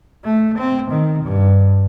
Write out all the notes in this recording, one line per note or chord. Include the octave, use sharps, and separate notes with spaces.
A3
C4
D#3
G2